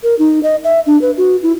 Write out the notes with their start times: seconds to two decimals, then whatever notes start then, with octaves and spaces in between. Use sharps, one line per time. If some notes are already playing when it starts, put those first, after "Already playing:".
0.03 A#4
0.19 D#4
0.43 D#5
0.64 E5
0.86 D4
1.02 B4
1.17 F#4
1.43 E4